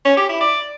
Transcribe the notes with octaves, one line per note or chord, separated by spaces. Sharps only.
C#4
G4
E4
D5